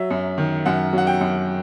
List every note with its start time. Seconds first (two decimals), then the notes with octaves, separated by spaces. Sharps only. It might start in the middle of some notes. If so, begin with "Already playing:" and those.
Already playing: F#3 E5
0.11 F#2
0.38 D#3
0.66 F#2 F#5
0.93 F#3 F#5
1.07 G5
1.21 F#2